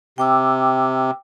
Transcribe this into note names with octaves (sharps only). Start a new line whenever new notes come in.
C3 G5 D6 E6